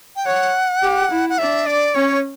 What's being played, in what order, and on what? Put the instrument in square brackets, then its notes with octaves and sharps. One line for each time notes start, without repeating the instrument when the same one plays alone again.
[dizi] G5
[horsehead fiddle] C#5 [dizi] F#5
[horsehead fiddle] G4
E4
[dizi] F#5
[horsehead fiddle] D4 [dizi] E5
[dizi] D5
[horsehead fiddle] C#4 [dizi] C#5